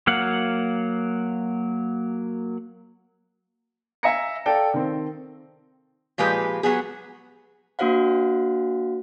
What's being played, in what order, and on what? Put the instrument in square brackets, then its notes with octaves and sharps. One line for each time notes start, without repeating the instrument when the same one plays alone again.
[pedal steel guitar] F#3 A#3 F5 F#5
[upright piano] E5 F5 G#5 A#5 A#6 C#7
A4 D5 F5 G5 A5
D#3 C4
[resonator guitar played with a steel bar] A#2 F3 G#3 G4 B4
F#3 B3 G#4
[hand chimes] A#3 D4 F#4 C5 F5 F#5